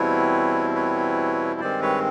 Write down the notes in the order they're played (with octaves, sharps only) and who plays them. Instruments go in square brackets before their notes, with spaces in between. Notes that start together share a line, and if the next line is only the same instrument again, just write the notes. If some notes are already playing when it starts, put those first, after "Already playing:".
Already playing: [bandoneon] E2 B2 G3 C4 E4 B4 C#5
B4 C#5
G2 D#3 G#3 C4 C5 D5
B4 C#5